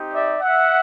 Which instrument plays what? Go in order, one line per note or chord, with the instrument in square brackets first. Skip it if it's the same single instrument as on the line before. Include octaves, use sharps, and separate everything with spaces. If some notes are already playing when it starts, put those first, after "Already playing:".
Already playing: [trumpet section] C4 D#4 G4
D5 E5
E5 F#5